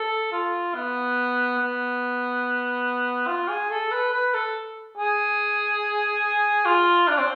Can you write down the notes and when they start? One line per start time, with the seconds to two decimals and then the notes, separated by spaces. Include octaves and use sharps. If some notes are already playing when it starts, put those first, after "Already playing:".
Already playing: A4
0.32 F4
0.75 B3
1.59 B3
3.28 F4
3.49 G#4
3.70 A4
3.91 B4
4.13 B4
4.34 A4
4.98 G#4
6.66 F4
7.08 D4
7.18 C4